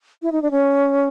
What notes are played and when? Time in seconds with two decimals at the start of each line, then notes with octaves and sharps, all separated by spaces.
0.22 E4
0.32 D#4
0.42 D4
0.51 C#4